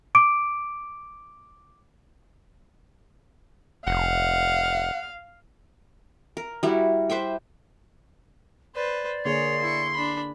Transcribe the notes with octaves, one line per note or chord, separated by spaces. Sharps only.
D6 D7
F1 F5 F#5
A#4
G3 E4 F#4
B4 C5 E5 G5
B4 C5 D5
D3 A#3 G#4 C#5 C6
E4 C#6
D4 B5